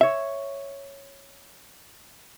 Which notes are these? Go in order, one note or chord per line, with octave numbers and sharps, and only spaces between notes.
C#5 E5